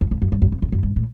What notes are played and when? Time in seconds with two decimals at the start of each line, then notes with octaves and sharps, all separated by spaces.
0.01 F2
0.11 F2
0.22 F#2
0.32 G2
0.42 F#2
0.52 F2
0.62 F2
0.72 F#2
0.83 G2
0.96 A2